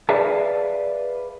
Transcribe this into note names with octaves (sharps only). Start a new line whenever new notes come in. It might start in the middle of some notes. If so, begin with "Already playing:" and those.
G#4 B4 D5 E5 F5 A5